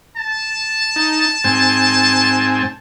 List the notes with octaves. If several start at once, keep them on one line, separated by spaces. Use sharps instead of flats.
A5
D#4
G#2 C4 G#5